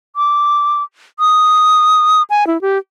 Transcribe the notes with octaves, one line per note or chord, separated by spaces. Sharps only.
D6
D#6
G#5
E4
G4